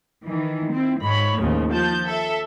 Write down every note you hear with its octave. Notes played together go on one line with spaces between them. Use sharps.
D#3 E3
C4 E4
G#2 C#5 B5
D#2 A2 C#3 F3
F3 A5 G6
A4 E5